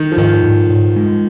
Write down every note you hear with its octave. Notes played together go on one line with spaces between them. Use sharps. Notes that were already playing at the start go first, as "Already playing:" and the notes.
Already playing: D#3
F3
G#2 D#3
G#2
G#2
G#3